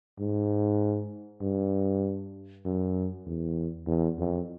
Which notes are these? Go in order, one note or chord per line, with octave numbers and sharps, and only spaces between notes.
G#2
G2
F#2
E2
E2
F2